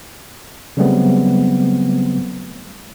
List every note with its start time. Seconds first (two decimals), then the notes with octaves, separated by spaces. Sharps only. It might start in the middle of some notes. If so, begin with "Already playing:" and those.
0.77 C#3 F#3 G3 A3 B3 C4